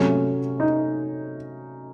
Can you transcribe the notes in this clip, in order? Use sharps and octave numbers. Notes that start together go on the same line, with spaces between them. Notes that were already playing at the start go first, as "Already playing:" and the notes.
Already playing: C3 F#3 A3 C#4
D#4